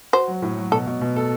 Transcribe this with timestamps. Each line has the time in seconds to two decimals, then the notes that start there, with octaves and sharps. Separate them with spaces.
0.13 F#4 C5
0.28 F#3
0.42 A2
0.57 F#3
0.72 B2 A4
0.87 B2
1.01 B2
1.16 A4